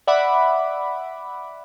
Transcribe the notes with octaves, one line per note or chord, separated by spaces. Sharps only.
D5 E5 F#5 B5 D6